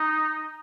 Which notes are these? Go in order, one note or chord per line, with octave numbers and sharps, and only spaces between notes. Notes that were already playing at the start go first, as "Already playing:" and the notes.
Already playing: D#4